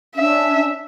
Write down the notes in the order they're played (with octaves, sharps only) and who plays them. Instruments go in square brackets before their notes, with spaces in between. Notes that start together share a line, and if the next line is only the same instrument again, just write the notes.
[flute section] C#4 D4 [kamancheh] E5